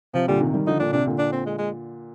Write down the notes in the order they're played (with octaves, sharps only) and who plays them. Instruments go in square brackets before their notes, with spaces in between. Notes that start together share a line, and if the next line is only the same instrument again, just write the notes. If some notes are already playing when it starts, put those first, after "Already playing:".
[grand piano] C3 [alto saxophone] F3
[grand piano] A#2 D3 [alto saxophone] G3
[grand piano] C3 D#3
D#3 G3
[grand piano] D3 F3 [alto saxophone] D#4
[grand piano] A#2 D3 [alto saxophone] D4
[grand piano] C3 [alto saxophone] D4
[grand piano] A#2 D3
[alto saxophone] D4
C4
G#3
G#3